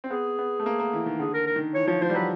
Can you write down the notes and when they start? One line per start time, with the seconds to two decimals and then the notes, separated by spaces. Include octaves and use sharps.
0.04 C4
0.10 B3 G#4
0.39 B3
0.60 A3
0.66 A#3
0.80 A#3
0.93 E3
1.06 D#3
1.19 D3 G#4
1.34 A#4
1.47 A#4
1.56 D#3
1.74 E3 C#5
1.87 F3 C#5
2.02 F3 C5
2.10 G3
2.15 F#3 B4